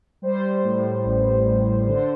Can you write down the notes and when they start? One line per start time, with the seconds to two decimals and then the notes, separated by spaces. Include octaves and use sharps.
0.22 G3 C5
0.63 A2
1.05 A1
1.45 A1
1.86 D3 C5